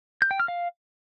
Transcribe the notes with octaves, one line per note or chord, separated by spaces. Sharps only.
G6
G5
F6
F5